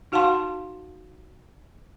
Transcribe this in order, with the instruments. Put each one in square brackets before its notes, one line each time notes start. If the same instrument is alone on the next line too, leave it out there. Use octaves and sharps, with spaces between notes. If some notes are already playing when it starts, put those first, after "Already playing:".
[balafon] D#4 F#4 F5 F#5 A5 C6